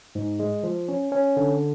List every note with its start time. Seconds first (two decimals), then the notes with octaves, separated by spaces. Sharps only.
0.15 G#2
0.39 G#3
0.63 F3
0.88 C#4
1.12 C#4
1.37 D3